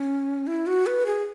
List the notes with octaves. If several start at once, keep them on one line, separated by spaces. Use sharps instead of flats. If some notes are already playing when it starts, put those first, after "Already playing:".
Already playing: C#4
E4
F#4
B4
G#4